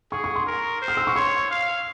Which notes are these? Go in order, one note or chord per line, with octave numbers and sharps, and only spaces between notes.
G#4 C#6
C#6
C6
A#4
C5
F6
E6
C#6
C#5 C6
F5